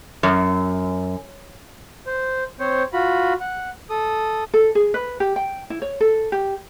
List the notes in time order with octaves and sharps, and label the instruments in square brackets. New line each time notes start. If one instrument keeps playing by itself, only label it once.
[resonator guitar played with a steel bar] F#2
[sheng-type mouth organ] C5
C4 C5 C#5
F4 F#4 B5
F#5
A4 D#6
[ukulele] A4
G#4
B4
G4
G5
E4
C#5
A4
G4